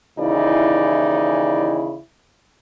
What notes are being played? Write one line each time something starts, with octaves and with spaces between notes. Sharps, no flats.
D#2 C#3 E3 D#4 E4 D5